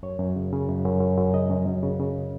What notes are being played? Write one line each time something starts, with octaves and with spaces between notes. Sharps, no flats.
F#2 C#5
F#2
C#3
C#3
F#2
F#2
F#2
F#2
C#3 D#5
F#2
F#2
C#3
C#3